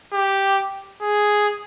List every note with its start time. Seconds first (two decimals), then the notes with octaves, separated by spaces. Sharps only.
0.13 G4
1.02 G#4